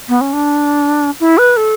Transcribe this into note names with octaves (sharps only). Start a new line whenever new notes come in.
B3
C#4
D4
E4
B4
A4